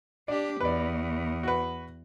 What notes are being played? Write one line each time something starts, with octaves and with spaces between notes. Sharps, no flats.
D4 G4 D5
E2 B4 D5
F#4 B4